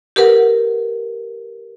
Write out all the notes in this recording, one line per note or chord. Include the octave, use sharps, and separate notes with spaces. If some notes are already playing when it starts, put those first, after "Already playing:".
G4 A#4 B4 F#5